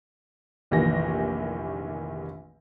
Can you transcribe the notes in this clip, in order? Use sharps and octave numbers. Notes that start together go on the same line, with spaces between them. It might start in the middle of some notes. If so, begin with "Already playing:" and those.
F1 A#1 D#3 E3 G4 A#6